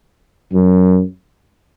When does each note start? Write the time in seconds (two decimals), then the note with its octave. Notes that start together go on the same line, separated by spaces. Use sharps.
0.52 F#2